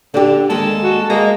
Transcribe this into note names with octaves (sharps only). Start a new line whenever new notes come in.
D3 D4 G4
D#2 G#3 A#3 A4
F#4
G#3 A#3 D#5